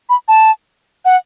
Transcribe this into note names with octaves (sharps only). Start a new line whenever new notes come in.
B5
A5
F#5